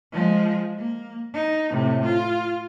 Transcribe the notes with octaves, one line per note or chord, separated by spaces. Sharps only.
F3 G#3
A#3
D#4
A2 C3
F4